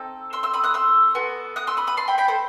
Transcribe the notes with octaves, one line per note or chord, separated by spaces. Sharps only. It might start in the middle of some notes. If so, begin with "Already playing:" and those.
Already playing: C4 D#4 A4
C6 E6
C6 E6
B5 D#6
D#6 F#6
C6 E6
B3 F#4 A4
D#6 F#6
C6 E6
B5 D#6
B5 D#6
A5 C6
G5 B5
G5 B5
A4 C5